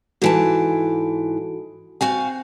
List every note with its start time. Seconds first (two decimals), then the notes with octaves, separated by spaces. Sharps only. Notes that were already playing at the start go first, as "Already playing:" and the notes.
0.22 G#2 E3 F#4 A4 A5 D7
2.01 C4 F#4 F5 G5 G#5